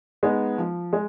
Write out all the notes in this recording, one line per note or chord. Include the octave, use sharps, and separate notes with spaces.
G#3 B3 D#4
F3
G#3